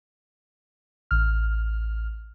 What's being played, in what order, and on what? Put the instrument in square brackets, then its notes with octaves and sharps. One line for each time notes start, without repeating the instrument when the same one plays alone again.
[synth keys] A1 F6